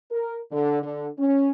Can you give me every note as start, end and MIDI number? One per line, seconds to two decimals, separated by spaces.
0.11 0.38 70
0.52 0.79 50
0.83 1.07 50
1.19 1.51 61